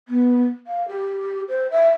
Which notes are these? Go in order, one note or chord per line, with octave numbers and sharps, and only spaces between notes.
B3
F5
G4
C5
E5